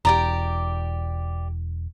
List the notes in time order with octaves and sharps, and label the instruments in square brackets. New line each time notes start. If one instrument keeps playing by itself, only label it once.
[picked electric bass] E1 [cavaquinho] G4 D5 A#5